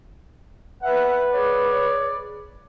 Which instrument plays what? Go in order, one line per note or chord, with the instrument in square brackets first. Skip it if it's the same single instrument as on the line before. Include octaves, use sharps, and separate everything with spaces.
[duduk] B4 [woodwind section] E5 F#5
[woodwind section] G#4 C#5 D5